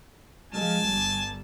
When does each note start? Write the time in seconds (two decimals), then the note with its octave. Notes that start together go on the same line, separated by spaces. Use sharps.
0.52 F3 G#3 G#5 A5
0.86 G1 G2